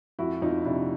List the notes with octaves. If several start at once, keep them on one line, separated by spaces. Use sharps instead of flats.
F2 E4 F#4
F2 D#4 F4
C3 D4 E4